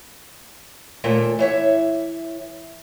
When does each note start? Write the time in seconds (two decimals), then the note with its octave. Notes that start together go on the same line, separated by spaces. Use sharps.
1.04 D#2 A#2 A3 E5 A#5
1.39 E3 C#5 E5